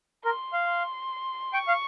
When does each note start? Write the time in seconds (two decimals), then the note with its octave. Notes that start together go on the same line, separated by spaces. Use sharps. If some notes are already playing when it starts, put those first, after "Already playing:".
0.24 A#4 C6
0.53 F5
0.67 C6
1.53 G5 C#6
1.68 F5